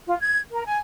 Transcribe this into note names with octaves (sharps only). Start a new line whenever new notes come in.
F4
G#6
A#4
G#5